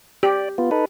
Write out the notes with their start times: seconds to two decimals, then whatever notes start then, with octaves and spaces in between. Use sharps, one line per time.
0.23 G4 D5
0.58 B3 F4
0.71 D#4 A4 B4